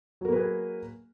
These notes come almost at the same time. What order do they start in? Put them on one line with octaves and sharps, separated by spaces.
F#3 A#4 A#3 B4 G#4